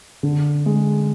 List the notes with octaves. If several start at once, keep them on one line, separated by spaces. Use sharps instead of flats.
D3
G#3